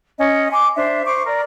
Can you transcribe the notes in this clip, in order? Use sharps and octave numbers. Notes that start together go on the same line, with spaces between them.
C#4 D#5
G#5 C6 D6
D4 C5 E5
C5 C#6 D6
A#4 D5